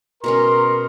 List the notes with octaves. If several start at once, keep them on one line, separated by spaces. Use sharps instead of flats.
B2 G#3 C#4 A#4 C6